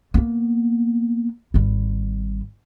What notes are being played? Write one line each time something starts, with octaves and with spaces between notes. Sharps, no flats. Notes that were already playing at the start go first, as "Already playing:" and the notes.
A#3 B3
G#1 G3